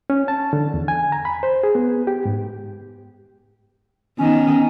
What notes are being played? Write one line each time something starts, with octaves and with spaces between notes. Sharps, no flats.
C#4
A5
D3
E2
G#5
A#5
B5
C5
G#4
B3
G4
G#2
D#3 B3 C#4 D#4